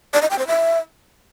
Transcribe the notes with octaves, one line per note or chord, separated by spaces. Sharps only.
D5
D#5
G5
C5
E5